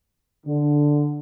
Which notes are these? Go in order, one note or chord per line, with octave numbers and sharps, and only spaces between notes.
D3